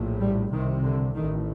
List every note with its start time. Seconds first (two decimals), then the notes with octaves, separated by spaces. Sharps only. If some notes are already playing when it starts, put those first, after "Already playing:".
Already playing: A#1 A2
0.20 G3
0.51 C2 C3 D#3
0.83 D3
1.14 A1 A2 D#3